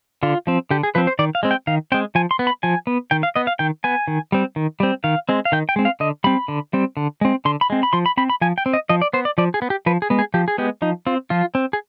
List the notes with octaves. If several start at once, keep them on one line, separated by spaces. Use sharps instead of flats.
D3 F4
F3 C4
D3 G4
G#4
F3 C4 B4
C5
D#3 D5
F5
G#3 C4
G5
D#3 F5
G#3 C4 G5
F3 G#5
C6
B3
B5
F3 G#5
B3
D#3 G5
F5
B3 D#5
F5
D#3 G5
B3 G#5
D#3
G3 C4
D#3
G3 C4
D#3 F5
G#3 C4
F5
D#3 G5
G5
G#3 C4
F5
D3 D#5
G3 C4 B5
D3
G3 C4
D3
G#3 C4
D3 C6
B5
G#3 C4
B5
F3 C6
B5
C4 B5
B5
F3 G#5
G5
C4
D#5
F3 D#5
D5
B3 C5
D5
F3 D5
G#4
B3
G4
F3 B4
G#4
G#3 B3
G#4
F3 G4
G#4
G#3 B3 G4
F3 D#4
C4 F4
F3 F4
C4
G#4